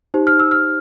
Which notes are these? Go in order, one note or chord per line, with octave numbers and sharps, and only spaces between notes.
D#4 G4 C5
F6
E6
F6